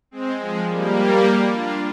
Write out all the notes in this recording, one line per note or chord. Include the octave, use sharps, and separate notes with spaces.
G#3 C4
F3 G#3
G3 A#3
D4 F4